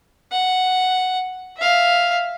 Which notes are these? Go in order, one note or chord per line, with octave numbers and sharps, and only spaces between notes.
F#5
E5 F5